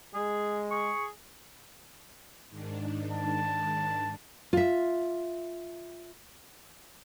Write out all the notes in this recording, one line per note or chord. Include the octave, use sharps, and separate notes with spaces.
G#3 G#4
G#4 C#6
G#2 D#3 D4
A5
F4 E5